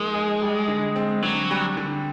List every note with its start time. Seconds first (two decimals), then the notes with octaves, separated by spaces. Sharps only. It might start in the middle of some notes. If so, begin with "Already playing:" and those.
Already playing: F3 G#3 A#3 D#4
0.14 G#4
0.42 G3
0.68 D3
0.96 C4
1.22 D3 F#3
1.51 G3
1.77 D3